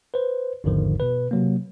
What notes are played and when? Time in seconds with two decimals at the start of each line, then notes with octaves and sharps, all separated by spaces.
0.14 B4 C5
0.64 G#1 E2 G#2 D3 D#3 F3
1.00 B2 B4
1.31 C3 F#3 A#3